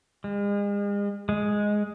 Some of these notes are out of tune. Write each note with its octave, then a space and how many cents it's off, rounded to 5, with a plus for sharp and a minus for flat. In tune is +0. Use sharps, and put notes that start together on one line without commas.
G#3 -40
G#3 +0